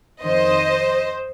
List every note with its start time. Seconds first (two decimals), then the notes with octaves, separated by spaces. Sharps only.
0.21 F2 D#3 C5 D#5